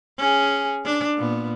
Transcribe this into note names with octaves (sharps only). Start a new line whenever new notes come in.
C#4 G#4
D4
A#2 B3